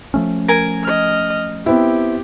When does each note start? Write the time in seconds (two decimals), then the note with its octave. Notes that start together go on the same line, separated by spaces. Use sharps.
0.14 F3 A3 C#4
0.48 A#4 G#5
0.83 D#5 F6
1.66 B3 C4 E4 G4